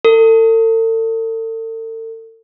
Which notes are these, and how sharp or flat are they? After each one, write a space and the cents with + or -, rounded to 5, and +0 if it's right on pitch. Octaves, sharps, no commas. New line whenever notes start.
A4 +40